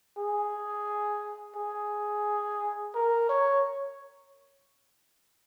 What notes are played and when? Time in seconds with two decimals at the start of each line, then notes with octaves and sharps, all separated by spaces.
0.18 G#4
1.56 G#4
2.95 A#4
3.30 C#5